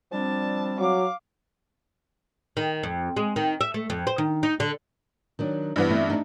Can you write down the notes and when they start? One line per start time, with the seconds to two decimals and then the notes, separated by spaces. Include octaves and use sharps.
0.12 F3 G3 C4 D4 A5
0.79 F#3 F5 D6
2.57 D#3
2.83 F2
3.17 G#3
3.36 D#3
3.61 E5
3.74 A3
3.90 F2
4.07 C5
4.18 D#3
4.43 D#4
4.60 D3
5.39 D#3 F#3 D4
5.76 G2 E3 B3
5.90 A3 C4 E4
6.10 D4 D#4